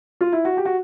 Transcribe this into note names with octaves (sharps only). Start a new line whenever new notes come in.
F4
E4
F#4
G4
F#4